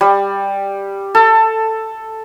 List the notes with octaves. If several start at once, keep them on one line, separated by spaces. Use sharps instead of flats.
G3
A4